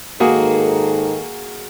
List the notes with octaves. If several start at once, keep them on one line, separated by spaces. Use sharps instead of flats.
G#2 D#3 A#3 F#4 G#4 A4